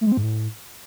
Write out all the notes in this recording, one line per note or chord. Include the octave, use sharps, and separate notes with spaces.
A3
G#3
C4
G#2
A2